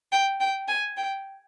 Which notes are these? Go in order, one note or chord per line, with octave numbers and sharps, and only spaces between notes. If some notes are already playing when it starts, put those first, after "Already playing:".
G5
G5
G#5
G5